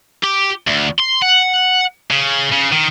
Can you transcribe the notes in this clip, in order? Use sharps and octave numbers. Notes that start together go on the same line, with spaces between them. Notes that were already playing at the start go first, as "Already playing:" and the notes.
G4
D2
C6
F#5
C#3
C#3
D#3